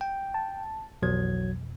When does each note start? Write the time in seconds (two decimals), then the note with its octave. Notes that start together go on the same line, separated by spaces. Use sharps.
0.01 G5
0.34 A5
1.02 B1 F2 B2 E3 F#3 G#6